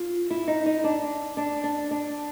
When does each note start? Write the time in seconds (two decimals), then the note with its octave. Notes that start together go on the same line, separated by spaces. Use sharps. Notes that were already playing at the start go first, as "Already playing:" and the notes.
Already playing: F4
0.30 E4
0.48 D#4
0.66 D#4
0.84 D4
1.37 D4
1.64 D4
1.91 D4